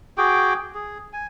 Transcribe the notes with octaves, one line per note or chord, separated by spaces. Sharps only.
F#4 G#4 G5 D6
G#4
G#5